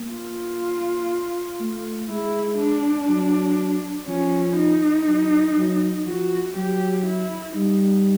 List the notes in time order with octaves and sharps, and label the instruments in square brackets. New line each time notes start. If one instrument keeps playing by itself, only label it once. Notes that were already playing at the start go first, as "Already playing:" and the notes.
Already playing: [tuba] A#3
[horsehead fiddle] F4
[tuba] A3
[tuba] G#3 [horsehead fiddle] E4
[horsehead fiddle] D4
[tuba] F#3
[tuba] F3 [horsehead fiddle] C#4
[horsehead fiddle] D#4
[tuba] F#3
F#3
[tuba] F3 [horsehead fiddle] F#4
[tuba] F#3 [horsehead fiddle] G4
[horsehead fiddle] E4
[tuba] G3 [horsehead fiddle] D#4